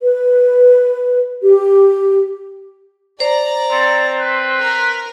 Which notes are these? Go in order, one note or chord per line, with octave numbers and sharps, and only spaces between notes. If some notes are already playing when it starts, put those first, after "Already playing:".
B4
G4
C5 D5 A#5
C4 A4
B4
A#4